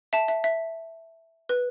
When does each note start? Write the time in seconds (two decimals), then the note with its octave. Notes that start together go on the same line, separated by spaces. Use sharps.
0.13 E5 A5
0.28 E5
0.44 E5
1.49 B4